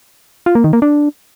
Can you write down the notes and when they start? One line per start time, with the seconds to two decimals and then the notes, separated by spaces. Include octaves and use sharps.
0.46 F4
0.55 A#3
0.64 D#3
0.73 A#3
0.82 D4